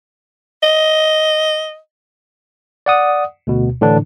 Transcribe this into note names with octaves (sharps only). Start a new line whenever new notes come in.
D#5
D5 F#5 D#6
D2 B2
A2 D3 E3 D4